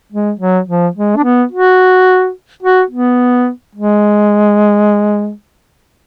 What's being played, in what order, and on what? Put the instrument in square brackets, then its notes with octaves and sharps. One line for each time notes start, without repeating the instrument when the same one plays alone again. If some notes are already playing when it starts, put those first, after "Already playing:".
[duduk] G#3
F#3
F3
G#3
D4
B3
F#4
F#4
B3
G#3